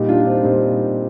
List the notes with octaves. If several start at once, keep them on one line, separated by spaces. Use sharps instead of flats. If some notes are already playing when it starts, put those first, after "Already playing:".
Already playing: A#2 G3 D#4 G4
D4 F4
F4
C4 D#4
A#2 G3 C4 D#4